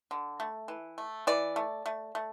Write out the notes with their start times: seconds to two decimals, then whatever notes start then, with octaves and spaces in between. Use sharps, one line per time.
0.11 D3
0.40 A3
0.68 E3
0.98 A3
1.27 E3 D5
1.56 A3
1.86 A3
2.15 A3